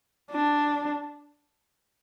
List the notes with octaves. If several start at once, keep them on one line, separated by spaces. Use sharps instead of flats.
D4